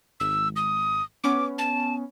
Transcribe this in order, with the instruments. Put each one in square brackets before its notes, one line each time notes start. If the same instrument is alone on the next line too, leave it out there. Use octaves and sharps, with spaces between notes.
[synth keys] G#1 [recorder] E6
[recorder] D#6
[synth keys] B3 C#4 [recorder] D6
[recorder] A5